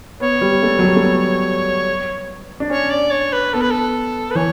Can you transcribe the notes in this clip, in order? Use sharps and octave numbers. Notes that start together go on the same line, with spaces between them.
B3 C#5
G3
A3
F#3
G3
A3
B3
D4
C#4 C#5
D5
C#5
B4
B3 A4
B4
A4
B4
E3 C#5